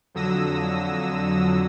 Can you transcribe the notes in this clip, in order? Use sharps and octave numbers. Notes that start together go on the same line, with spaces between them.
F2 D3 F#3 D#6 E6 A#6